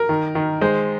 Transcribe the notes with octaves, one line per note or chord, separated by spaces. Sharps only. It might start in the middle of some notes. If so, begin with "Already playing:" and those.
Already playing: A#4
D#3
D#3
G#3 C5